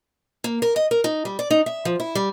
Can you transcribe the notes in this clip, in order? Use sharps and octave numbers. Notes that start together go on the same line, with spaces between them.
A#3
A#4
D#5
A#4
D#4
G3
D5
D#4
E5
F3
E4
G3